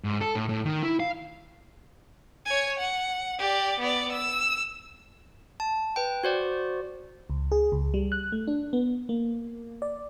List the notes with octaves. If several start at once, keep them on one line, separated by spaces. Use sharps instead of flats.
G#2
A4
A2
A2
D#3
E4
F5
C#5 G#5
F#5
G4 D5
B3 D5
E6
A5
B4 G5
F#4 C5 D5
C#2
G#4
C#2
G3
F#6
A3
D4
B3
A#3
D5